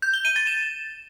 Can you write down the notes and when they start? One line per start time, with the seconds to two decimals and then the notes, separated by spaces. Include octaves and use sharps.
0.02 G6
0.14 G7
0.25 D#7
0.36 A6
0.47 E7